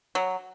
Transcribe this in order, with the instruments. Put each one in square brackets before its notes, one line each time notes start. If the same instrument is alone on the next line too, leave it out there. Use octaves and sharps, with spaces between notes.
[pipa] F#3